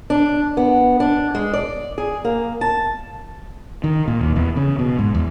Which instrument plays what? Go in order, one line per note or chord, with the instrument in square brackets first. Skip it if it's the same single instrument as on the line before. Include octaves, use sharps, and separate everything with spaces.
[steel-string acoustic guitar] D4
B3
D4
G#3
D5
G#4
A#3
A5
[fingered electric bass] D#3
A#2
D#2
E2
C#3
B2
G#2
E2